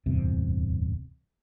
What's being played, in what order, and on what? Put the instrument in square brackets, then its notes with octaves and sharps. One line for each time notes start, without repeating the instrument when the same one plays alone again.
[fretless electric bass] D1 E2 G2 C3